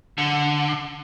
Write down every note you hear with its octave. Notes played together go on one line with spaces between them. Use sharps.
D3